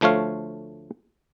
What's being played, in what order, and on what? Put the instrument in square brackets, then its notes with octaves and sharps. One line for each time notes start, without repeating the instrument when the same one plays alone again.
[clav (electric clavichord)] D2 F3 A3 C#5 F5